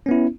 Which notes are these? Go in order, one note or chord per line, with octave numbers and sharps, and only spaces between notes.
B3 C#4 E4